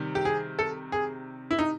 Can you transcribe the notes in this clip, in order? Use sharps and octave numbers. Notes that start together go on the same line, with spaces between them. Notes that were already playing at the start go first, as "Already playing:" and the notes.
Already playing: C3 D#3 G3
G4
G#4
A4
G#4
E4
D#4